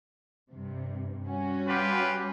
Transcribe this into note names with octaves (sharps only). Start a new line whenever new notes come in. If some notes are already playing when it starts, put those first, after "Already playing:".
G2 C3
G3 C#4 F#4
F4 G4 B4